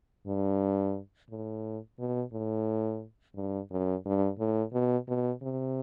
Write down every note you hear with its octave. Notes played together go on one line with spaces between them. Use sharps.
G2
A2
B2
A2
G2
F#2
G2
A2
B2
B2
C3